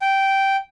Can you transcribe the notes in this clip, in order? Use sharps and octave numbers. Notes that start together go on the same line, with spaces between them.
G5